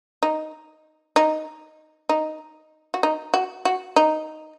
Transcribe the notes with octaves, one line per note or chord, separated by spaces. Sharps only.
D#4
D#4
D#4
F#4
D#4
F#4
F#4
D#4